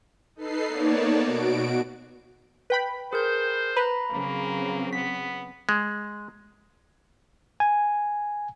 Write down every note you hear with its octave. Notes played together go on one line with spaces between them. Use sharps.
D#4 A4 B4 C7
A#3 B3 D#4 C#5 D5 A5
B2 F#4 D7
B4 G5 B5
G#4 A#4 C5 G6
B4 A#5 B5
C#3 F#3 A#3 C4
B3 B6
G#3
G#5